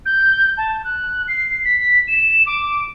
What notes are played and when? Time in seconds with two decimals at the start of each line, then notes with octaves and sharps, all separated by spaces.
0.06 G6
0.58 A5
0.84 F#6
1.28 C7
1.65 B6
2.08 E7
2.47 D6